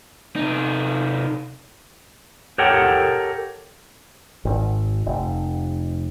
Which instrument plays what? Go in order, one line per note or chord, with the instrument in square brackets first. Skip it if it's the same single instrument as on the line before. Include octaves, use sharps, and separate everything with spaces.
[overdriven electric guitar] C3 D#4
[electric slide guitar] G4 A4 A#4 C#5 F#5 G5
[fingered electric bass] G#1
F1